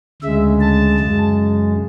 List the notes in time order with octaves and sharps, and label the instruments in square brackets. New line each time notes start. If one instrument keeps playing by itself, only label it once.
[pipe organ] D2 C#3 G#3 E5
A5
F#2 C#3 G#3